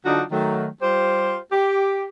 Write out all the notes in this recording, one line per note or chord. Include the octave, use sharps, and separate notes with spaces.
D3 F#3 D4 D#4 F4 F#4
D#3 F#3 A3
G3 F4 G4 C5
G4